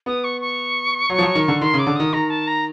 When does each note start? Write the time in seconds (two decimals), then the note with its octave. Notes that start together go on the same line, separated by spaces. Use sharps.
0.06 B3 D#6
0.23 C#6
0.41 C#6
1.09 F#3
1.18 F3
1.22 F#3
1.35 D#3
1.48 D3
1.61 D#3 C6
1.74 C#3 D6
1.87 D3
1.95 D#3 D#6
2.13 D#3 A#5
2.29 A5
2.47 A#5